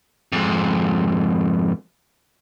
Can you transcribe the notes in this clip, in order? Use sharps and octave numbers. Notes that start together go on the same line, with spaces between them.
F2 G#2